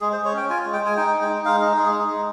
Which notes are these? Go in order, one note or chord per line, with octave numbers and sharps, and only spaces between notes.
G#3 G#4
C5
G#3
C#5
C#4 G5
F4 G#5
G#3
G5
G#3
G#5
D#4 G5
G#3
G5
D#4
G#3 F5
D#4 D#5
G#3 G#4
D#4
G#3